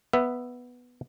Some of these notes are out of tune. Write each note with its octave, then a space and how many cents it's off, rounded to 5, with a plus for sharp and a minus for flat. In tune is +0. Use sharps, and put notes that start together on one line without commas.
B3 +0 E5 +5